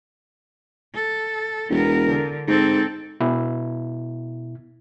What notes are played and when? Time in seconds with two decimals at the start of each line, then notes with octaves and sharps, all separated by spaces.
0.94 A4
1.70 E1 B3 A#4
2.09 D3
2.48 G#2 C4 A4
3.20 B2 E4